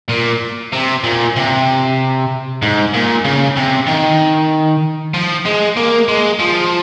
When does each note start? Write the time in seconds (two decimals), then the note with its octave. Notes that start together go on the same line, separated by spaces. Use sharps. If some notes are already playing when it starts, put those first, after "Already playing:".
0.09 A#2
0.73 C3
1.04 A#2
1.36 C3
2.62 G#2
2.94 A#2
3.25 C#3
3.57 C3
3.87 D#3
5.14 F3
5.46 G#3
5.77 A#3
6.08 G#3
6.39 F3